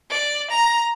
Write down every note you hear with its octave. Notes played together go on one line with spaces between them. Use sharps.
D5
A#5